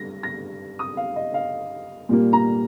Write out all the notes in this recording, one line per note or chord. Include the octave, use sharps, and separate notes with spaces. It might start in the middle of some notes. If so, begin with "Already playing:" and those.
Already playing: G2 A#6
A#6
D#6
F5
D#5
F5
A#2 G3 A#3
A#5